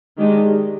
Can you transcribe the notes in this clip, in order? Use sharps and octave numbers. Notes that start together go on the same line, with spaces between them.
D#3 G#3 D4 G4